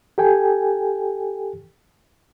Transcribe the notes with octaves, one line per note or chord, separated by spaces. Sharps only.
G4 A4 G5 G#5